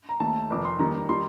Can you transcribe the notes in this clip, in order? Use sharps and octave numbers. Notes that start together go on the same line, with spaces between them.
A#5
D#2 D#3 A3 A5
F1 F2 D#3 D6
C6
D#2 D#3 G3 A#5
D#3 G3 C6